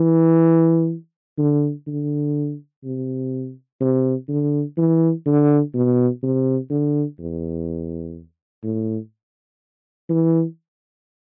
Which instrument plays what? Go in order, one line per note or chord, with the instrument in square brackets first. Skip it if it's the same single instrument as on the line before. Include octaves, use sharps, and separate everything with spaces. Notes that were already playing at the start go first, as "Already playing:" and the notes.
Already playing: [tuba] E3
D3
D3
C3
C3
D3
E3
D3
B2
C3
D3
E2
A2
E3